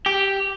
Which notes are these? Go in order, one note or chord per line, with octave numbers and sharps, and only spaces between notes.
G4